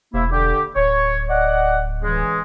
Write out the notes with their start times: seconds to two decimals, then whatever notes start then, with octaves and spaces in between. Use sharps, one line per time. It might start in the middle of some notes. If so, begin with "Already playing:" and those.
0.14 E1 C3 A#3 E4
0.32 D3 G4
0.76 D1 C#5
1.29 D5 D#5 F#5
2.03 C#3 E3 G#3